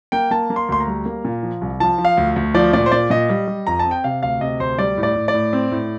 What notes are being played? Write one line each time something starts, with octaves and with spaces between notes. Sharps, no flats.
A#3 G5
A#3 A5
A#3
C6
D2 C6
A#5
G3
A#3
A#2
F3
C2
F3 A5
F3
F5
D2
D2
F3 D5
A#2 D5
C5
A#2 D5
A#2 D#5
G3
G3
F2 A#5
A5
C4
G5
C3 F5
D2 F5
C3 D#5
D2 C5
G3 D5
A2
D5
A2
D5
A2
C4
A2